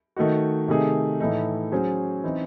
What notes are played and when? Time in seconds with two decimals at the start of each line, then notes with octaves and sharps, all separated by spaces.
0.16 D#3 A3 D#4 F#4
0.68 C3 D#3 A3 D#4 G#4
1.20 A2 E3 A3 D#4
1.72 F#3 C#4 G#4 C5
2.24 E3 C4 D#4